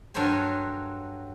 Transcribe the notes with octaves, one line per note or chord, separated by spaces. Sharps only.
G2 F#3 A4 A#4 C5 G#5